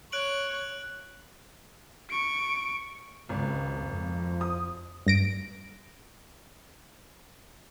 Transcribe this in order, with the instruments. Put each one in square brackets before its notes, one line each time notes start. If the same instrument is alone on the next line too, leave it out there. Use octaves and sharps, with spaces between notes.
[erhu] C#5 [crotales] F#6 D7 F#7
[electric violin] C#6 D7
[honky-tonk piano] G#1 [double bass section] C#2
[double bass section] F2 F3
[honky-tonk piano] D#6
[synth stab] G2 A#6 D7